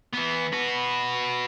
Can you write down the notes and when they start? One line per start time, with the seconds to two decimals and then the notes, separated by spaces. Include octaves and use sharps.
0.13 E3 B3
0.53 F#4 B4